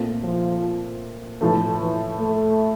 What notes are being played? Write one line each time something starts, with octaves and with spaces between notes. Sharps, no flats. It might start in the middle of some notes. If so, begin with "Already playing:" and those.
Already playing: A#2 A3 C4 F4
F3
A2 E3 F3 A3
E3
A3